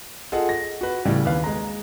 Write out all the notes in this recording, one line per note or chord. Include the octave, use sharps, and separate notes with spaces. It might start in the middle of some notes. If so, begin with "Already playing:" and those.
F4 G#4 A4 D#5 F#5
A#6
F#4 B4
A2 C#3 E3 G3
D#2 B4 F5
G#3 A#5